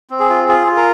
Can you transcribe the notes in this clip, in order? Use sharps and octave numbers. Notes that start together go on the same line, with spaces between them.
C4
G#4
F4
F4 G#4
F4
A#4